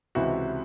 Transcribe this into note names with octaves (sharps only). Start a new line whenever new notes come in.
C#2 C3 E3 E4 F#4